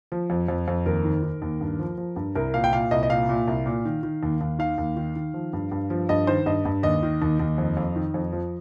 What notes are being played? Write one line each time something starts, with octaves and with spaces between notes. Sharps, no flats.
F3
F2
F2
F2
D#2 A#4
D#3
D#3
D#2
G2
F3
F3
G2
C2 A#4
A#2 F5
G5
A#2 F5
C2 D#5
D#5
A#2 F5
A#2
C2
A#2
D#3
D#3
D#2
D#2
D#3 F5
D#2
D#3
D#3
F3
G2
G2
F3
G2 D#5
D#3 C5
G2 D#5
G2
D#2 D#5
D#3
D#2
D#2
F2
F2
D#3
F2
F3